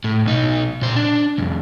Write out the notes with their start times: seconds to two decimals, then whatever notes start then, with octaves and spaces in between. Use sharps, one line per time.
0.04 A2
0.25 B1 D#4
0.82 A#2 C5
0.96 D4
1.38 C2 F2